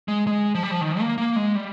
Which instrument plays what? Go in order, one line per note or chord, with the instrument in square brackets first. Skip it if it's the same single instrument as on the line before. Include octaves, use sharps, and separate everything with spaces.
[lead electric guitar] G#3
G#3
F3
G3
F3
D#3
A#3
A#3
G#3
G3